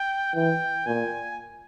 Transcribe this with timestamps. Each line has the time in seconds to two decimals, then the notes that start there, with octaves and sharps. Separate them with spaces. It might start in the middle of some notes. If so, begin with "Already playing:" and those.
Already playing: G5
0.35 E3 G5
0.87 A#2 G#5